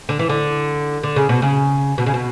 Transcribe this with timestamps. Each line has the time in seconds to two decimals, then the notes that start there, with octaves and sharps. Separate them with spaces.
0.09 D3
0.19 E3
0.29 D3
1.03 D3
1.16 C#3
1.29 B2
1.42 C#3
1.98 B2
2.06 C#3
2.14 B2